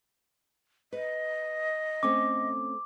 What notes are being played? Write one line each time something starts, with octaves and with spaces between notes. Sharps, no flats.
B4 D#5
A3 C4 C#4 D6